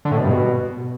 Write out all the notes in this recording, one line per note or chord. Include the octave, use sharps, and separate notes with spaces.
D3
A2
B2
G2
B2